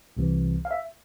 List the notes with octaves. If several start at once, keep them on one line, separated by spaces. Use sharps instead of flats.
C2 C3 E3
F5
E5